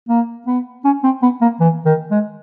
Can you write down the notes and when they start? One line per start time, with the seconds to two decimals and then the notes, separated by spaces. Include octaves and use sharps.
0.09 A#3
0.47 B3
0.85 C#4
1.04 C4
1.23 B3
1.41 A#3
1.60 E3
1.86 D#3
2.11 G#3